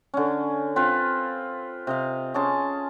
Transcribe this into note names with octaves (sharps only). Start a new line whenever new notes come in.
D3 C#4
C4 F4 B4
C3 D#5 F5
C#4 G#4 A5 C6